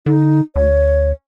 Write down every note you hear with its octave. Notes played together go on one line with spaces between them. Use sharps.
D3 D#4
D2 C#5